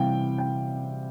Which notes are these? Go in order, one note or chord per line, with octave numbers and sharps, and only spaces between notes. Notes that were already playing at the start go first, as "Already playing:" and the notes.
Already playing: C3 E3 G3 F5 G5
G5